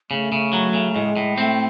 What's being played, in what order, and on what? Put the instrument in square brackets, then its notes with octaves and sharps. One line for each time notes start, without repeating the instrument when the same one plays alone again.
[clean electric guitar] C#3 [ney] A3
[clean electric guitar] C#3
F#3
C#3
[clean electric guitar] A2 [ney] G#3
[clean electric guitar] A2
[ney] A3 [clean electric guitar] C4